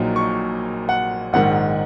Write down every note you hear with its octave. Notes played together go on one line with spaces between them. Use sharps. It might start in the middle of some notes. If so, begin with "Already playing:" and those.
Already playing: A#1 A#2 F#3 A#3 D#4
C#6
F#5
A#1 G#2 D#3 F#5